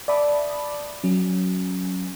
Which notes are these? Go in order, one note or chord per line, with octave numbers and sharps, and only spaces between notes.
D5 E5 A5 B5 D6 D#6
F#3 C#4